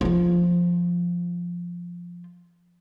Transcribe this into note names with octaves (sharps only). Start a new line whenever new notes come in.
F3 F4